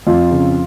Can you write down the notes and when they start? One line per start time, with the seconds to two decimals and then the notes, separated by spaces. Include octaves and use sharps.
0.07 F2 F4
0.31 C#3